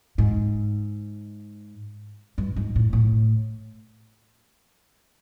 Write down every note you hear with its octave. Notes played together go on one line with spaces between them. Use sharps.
G#2
G2
G#2
A2
A2